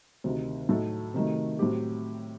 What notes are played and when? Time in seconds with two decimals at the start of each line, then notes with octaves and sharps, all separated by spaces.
0.24 D2 C3 D#3
0.69 A2 F#3 A3 D#4 A4
1.14 C3 D#3 F#3 A3
1.59 A2 F#3 C4 G4